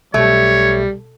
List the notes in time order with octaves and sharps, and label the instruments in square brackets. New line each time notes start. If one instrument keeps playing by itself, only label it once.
[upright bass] B1 [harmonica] G3 [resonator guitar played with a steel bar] A3 [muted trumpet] C#5